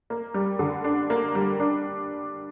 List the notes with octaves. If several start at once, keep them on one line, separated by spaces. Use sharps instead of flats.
A#3
G3
D3
D4
A#3
G3
D4